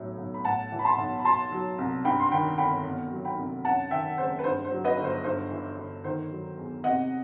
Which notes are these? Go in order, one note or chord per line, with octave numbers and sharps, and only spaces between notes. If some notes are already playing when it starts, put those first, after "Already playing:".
Already playing: B1 A2 F#3
B1
B5
A2 F#5 A5
E3
B5
A5 C6
B1
B5
B2 A5 C6
F#3
C2
G2 G5 B5
C6
D#3 G5 B5
G1 G5 B5
B2
F#3
G5 B5
C2
F#2 F#5 A5
D#3 E5 G5
F#1 C5
B4
G2 C5
C5
F#3
B4 D#5
G1
C5
G2 C5
E3
G1
D#3 C5
F#3
E2
C3 D#5 F#5